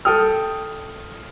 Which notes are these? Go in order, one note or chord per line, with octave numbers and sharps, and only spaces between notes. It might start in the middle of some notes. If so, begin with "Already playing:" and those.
A4 G5 D#6 F6